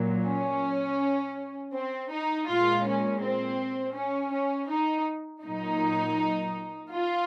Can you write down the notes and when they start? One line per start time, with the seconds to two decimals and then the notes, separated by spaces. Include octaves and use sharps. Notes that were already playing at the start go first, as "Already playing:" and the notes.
Already playing: A#2 F#3
0.26 C#4
1.74 C4
2.11 D#4
2.48 A#2 G#3 F4
2.85 C#4
3.22 C4
3.96 C#4
4.33 C#4
4.69 D#4
5.44 A#2 F#3 D#4
6.91 F4